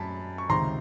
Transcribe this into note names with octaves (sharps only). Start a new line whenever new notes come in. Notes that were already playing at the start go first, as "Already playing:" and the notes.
Already playing: F#2 A5 B5
C#6
C#2 C3 D#3 A#5 C6